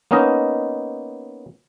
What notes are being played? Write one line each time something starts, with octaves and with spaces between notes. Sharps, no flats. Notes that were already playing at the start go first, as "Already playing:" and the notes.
A#3 B3 C#4 D#4 D#5